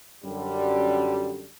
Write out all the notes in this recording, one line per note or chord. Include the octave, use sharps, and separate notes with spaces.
F#2 D3 G3